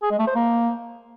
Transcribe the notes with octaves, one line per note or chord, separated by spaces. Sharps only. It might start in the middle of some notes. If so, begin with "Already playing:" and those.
G#4
G#3
A3
C5
A#3